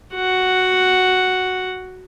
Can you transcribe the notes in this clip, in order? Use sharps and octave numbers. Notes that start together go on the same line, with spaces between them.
F#4 F#5